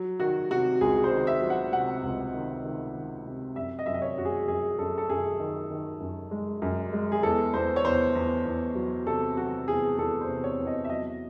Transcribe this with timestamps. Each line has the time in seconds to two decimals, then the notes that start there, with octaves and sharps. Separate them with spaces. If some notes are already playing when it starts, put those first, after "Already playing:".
Already playing: F#3
0.20 D#3 F#4
0.50 C3 F#4
0.81 C#2 G#4
1.04 C5
1.11 D#3
1.27 E5
1.42 F#3
1.50 F#5
1.72 C3 F#5
2.04 C#2
2.34 D#3
2.64 D#3
2.95 D#3
3.26 C3
3.56 F#2 E5
3.79 D#5
3.86 F#2 E5
3.94 D#5
4.02 C#5
4.17 F#2 F#4
4.25 G#4
4.48 F#2 G#4
4.79 F#2 A4
4.98 A4
5.09 F#2 G#4
5.40 D#3
5.70 D#3
6.00 F#2
6.31 G#3
6.62 F#2
6.93 G#3
7.12 G#4
7.23 E2 A4
7.54 E2 C5
7.76 C#5
7.85 E2 C5
8.15 E2
8.45 E2
8.75 F#3
9.06 C3 A4
9.37 F#3 F#4
9.68 E2 G#4
9.98 E2 A4
10.21 C5
10.29 C3
10.44 C#5
10.60 E2
10.67 D#5
10.84 E5
10.89 F#3 D#5